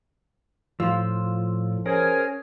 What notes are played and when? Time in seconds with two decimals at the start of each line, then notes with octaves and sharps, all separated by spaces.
0.80 A2 F3 F4 E6
1.86 C#4 G#4 A#4 C5 G#5